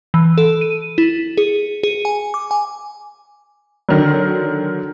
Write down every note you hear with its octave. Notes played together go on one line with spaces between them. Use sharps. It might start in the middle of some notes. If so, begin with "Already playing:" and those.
E3
A4
D#7
E4
G#4
G#4
G#5
D6
G#5
D3 D#3 F#3